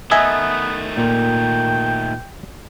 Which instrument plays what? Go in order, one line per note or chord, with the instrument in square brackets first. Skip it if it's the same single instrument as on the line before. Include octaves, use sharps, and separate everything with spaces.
[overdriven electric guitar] D#3 A3 [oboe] B3 [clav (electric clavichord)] D#5 E5 G#5
[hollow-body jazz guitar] A#2 A#3 [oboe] G5